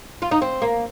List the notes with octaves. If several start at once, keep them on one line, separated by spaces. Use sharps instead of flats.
F4
D#4
C4
A#3